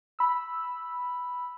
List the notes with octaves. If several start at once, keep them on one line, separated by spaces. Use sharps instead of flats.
B5 E6